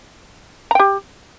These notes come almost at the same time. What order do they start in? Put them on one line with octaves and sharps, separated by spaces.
A#5 G5 G4